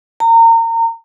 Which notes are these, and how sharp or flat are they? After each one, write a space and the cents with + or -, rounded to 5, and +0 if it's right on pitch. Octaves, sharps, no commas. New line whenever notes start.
A#5 -30